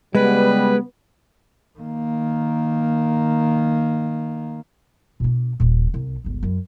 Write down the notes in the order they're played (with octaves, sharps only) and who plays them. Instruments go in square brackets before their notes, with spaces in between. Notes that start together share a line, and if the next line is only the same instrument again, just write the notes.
[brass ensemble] C#3 G3 B3 [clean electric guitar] G#3 [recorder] B4
[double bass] D#3 A#3
[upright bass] B2 D4
D#1 A#2
C2
G1 C#2
F#2